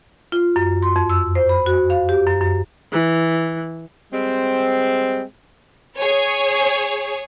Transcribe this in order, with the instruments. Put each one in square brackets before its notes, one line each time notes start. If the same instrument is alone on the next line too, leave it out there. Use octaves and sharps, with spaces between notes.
[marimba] F4
F#2
C6
F2
E6
C5
B5
F#4
F5
G4
F#2
F#2
[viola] E3
[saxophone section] G3 G#3 C4
[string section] G#4 C#5